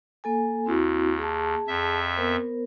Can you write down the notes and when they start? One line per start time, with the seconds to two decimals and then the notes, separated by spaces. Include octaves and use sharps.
0.24 A#3 A4 G#5
0.66 D#2 C4 E4 F#4
1.18 G#4 A5
1.68 F2 E5
2.17 B3 A#4 C5